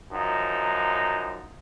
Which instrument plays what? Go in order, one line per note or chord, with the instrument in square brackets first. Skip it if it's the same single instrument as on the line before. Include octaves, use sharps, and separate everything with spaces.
[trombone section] F#2 F3 D#4